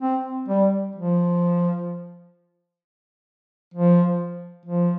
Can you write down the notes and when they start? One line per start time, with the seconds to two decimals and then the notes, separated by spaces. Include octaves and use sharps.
0.02 C4
0.48 G3
0.95 F3
3.74 F3
4.66 F3